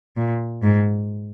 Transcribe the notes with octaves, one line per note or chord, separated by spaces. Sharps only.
A#2
G#2